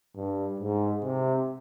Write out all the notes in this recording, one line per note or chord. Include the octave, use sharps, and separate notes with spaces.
G2
G#2
C3